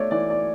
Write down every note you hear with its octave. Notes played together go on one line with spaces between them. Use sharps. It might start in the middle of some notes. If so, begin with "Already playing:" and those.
Already playing: A3 C#5 D5
E3 D5
D5